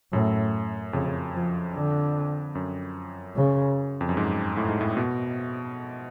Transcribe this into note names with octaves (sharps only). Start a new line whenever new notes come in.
F#2 A2
F2 C#3
F3
D3
F#2
C#3
F2
F#2
G#2
A2
G#2
A2
B2